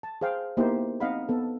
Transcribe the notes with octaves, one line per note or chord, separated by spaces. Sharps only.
A5
G#4 C5 F5 G5
A#3 B3 D#4 E4 G4 C5
C4 D#4 D#5 F5 F#5 B5
B3 A4